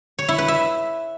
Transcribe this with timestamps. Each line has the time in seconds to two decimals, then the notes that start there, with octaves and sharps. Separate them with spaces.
0.19 C#5
0.28 E4
0.38 B4
0.48 E5